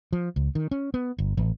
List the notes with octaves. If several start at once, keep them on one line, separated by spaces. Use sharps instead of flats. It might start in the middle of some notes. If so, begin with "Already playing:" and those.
F3
C#2
D#3
C#4
B3
G1
A1